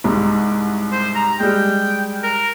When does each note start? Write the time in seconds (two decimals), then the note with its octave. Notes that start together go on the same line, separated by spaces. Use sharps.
0.04 C2 G#2
0.92 C5
1.15 A#5
1.40 G3 G#3 G5
2.23 A#4